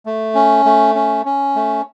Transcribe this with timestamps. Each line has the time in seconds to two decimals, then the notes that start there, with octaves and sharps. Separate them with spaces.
0.06 A3
0.35 C#4
0.65 A3
0.95 C#4
1.25 C#4
1.56 A3